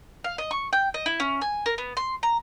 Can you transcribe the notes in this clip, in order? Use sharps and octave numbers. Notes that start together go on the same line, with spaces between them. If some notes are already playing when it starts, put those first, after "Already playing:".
F5
D#5
C#6
G5
D#5
E4
C#4
G#5
A#4
B3
C6
A#5